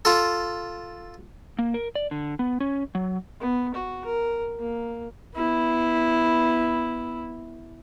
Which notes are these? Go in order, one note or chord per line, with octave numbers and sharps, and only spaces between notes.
F4 A4
A#3
A#4
D5
D3
B3
C#4
F#3
B3
F#4
A#4
A#3
B3 E4